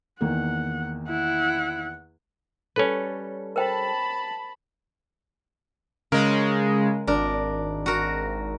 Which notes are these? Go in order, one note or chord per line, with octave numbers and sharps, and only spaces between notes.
E2 D#3 A#3 F#5
E4 F#5
G3 C#4 A4 B4 C#5
A#4 C5 G5 A5 B5
C#3 G#3 A#4
G#1 D4 A#4
F#4 A#4